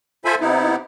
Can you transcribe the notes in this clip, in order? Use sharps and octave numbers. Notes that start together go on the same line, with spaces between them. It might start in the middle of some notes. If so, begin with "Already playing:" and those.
F4 A4 C5 E5 G#5 B5
C3 B3 D#4 E4